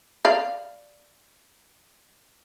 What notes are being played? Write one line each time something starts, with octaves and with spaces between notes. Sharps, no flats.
D5 F5